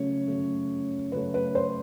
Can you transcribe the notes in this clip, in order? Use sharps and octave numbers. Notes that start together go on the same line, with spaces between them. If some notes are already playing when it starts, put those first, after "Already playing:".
Already playing: C#3 F#3 A3 C#5
C#3 F#3 A3
C#3 F#3 A3 B4
B4
C5